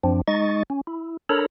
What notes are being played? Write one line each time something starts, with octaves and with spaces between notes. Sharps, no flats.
F#2 F3 C4 D4
G#3 D#4 D#5 C#6 A6
C#4
E4
D4 A4 A#4 C#5 A#5 B5